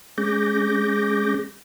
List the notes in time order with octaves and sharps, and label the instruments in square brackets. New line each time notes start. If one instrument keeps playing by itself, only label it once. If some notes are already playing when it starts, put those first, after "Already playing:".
[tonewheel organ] G#3 C#4 G#4 D6 G6 A#6